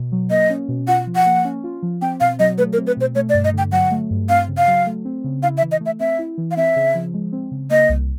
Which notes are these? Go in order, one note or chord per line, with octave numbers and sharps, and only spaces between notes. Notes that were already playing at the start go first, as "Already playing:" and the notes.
Already playing: B2
F#3
A#3 D#5
C#4
B2
F4 F#5
F3
F#5
A#3
C#4
F4
F3
C4 G5
B2 F5
F#3 D#5
A3 B4
A#4
C4
B4
B2 C5
A3 C#5
D5
G2
D#5
D3 G5
F#3 F#5
A3
G2
C4 F5
C#3
F5
F#3
A3
C4
C#3
E4 F5
E5
E3
D#5
A3
E5
C4 E5
E4
E3
F5
C4 E5
C#3
F3
G#3
C4
C#3
A#3 D#5
C2